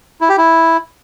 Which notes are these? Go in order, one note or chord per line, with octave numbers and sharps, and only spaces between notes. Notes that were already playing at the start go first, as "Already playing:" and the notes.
E4
G4
E4